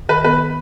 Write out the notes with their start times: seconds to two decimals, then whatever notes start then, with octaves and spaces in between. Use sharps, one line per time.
0.09 D#3 B4
0.24 B3 B4